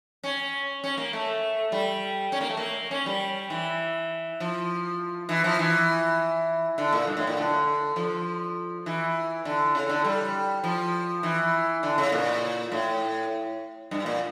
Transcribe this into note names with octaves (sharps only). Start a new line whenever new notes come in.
C#4
C#4
A#3
A3
G3
C#4
A#3
A3
A#3
C#4
G3
E3
F3
E3
F3
E3
D3
A#2
G2
A2
A#2
D3
F3
E3
D3
C#3
D3
G3
F3
E3
D3
C#3
A#2
A2
G2
A#2